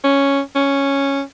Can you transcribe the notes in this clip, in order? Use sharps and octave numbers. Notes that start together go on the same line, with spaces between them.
C#4
C#4